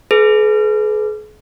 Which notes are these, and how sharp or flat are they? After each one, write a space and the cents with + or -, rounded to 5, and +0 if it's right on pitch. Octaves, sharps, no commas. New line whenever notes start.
G#4 +40 B4 +0